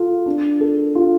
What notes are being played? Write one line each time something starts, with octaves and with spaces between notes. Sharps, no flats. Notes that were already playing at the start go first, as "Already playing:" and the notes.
Already playing: F4 A4
D4
A4
F4